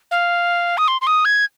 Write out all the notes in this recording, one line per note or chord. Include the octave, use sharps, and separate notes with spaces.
F5
D#6
C6
C6
D#6
G#6